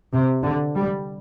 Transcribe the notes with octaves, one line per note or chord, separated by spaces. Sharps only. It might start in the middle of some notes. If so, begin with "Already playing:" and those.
C3
D3
G3